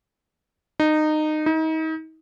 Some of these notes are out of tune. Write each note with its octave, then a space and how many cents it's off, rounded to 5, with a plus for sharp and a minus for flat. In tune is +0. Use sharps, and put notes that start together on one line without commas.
D#4 -20
D#4 +35